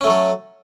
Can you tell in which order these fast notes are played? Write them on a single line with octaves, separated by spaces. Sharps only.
C#4 A3 F#3 A4